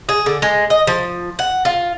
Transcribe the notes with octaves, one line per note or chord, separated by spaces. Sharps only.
G#4
D3
G#3
D#5
F3
F#5
F4